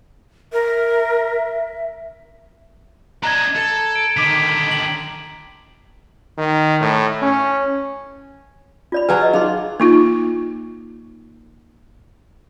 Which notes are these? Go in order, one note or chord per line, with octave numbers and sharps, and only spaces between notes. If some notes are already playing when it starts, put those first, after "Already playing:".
A#4 E5
D4 D#5 A#5 G#6
A4
D7
D3 D#3 D6 B6
F#7
D#3
A2
C#4
F4 D5 B5
F#3 G#4 B4 A5
D#5
D#4 F4 G#4 C6
A#3 D#4 F4